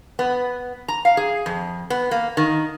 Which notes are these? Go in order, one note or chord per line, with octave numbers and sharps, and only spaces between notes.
B3
A#5
F5
G#4
F2
B3
A#3
D#3